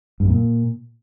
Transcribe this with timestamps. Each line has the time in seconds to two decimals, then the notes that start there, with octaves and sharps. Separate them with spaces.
0.20 G2
0.25 F#2
0.30 A#2